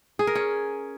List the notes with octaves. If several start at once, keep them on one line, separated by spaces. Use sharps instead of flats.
G#4
A#4
C#4